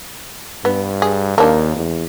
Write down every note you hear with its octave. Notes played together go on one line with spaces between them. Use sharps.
G2 B3
G#4
D#2 A#3 D4
E2